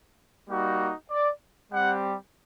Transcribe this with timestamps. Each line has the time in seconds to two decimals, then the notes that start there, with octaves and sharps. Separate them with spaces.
0.48 G3 A#3 D#4 F#4
1.10 D5
1.72 G3 C4 G4 F#5